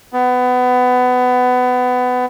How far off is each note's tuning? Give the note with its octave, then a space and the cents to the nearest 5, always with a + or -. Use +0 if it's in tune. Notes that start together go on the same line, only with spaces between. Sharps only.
B3 +20